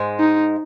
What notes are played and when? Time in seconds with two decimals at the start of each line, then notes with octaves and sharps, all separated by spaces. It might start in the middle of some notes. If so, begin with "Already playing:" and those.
Already playing: G#2 G#3
0.20 D#4